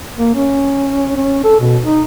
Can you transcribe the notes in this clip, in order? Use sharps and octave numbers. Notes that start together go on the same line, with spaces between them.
A#3
C#4
C#4
A4
B2
D#4